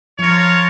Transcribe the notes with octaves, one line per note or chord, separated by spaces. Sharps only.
F3 F4 A#4 C#5